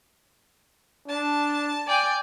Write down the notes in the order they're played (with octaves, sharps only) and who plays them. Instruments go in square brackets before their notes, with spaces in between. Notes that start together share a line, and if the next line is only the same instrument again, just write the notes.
[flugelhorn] D4 [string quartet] A5
[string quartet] D5 G5 G#5